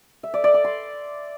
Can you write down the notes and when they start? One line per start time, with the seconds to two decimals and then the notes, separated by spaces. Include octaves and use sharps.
0.23 E5
0.34 D5
0.44 D5
0.54 D6
0.64 C6